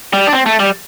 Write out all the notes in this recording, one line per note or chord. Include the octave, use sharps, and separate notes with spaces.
G3
D4
C4
A3
G3